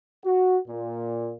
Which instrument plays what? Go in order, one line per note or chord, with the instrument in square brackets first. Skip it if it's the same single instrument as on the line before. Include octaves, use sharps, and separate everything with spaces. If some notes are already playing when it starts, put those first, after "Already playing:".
[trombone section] F#4
A#2